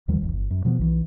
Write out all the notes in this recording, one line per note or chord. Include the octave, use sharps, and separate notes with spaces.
D#2 D#3 F3 G3
D1 A1 E2
G1
F#2
B2 F3 G3 B3
B1 E3